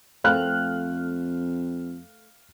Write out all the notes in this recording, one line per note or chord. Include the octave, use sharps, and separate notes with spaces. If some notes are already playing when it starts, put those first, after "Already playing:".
F2 A3 C4 A4 F5 F6 F#6